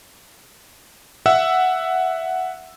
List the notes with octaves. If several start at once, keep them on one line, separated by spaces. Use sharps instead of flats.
E5 F#5 E6